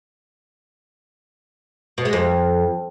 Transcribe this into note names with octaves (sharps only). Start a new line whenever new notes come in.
B2
G#3
F2